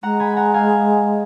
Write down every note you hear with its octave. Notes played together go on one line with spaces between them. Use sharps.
G#3 F#5 A#5
G#5 B5
F#5 A#5
F5 G#5